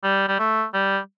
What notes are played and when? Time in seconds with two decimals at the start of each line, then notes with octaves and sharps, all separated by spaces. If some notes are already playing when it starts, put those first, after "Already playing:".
0.03 G3
0.28 G3
0.39 A3
0.74 G3